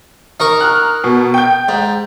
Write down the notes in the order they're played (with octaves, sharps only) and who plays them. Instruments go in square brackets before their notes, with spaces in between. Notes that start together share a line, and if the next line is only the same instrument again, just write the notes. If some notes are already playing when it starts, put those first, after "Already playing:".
[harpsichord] D#4 A#4 C#6
[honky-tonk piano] A#5 F6 F#6
B2
G5 G6
[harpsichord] G#2